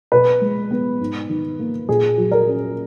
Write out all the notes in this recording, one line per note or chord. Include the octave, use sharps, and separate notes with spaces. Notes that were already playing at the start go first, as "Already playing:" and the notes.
B2 B4
G#3
B3
G#2
D#3
A#3
A#2 G#4
F#3
A#4
C#4